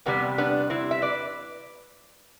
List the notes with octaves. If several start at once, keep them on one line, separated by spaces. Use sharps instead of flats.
E2 C3 G3 B3
B3 D4
C4 E4
E5
B4 D5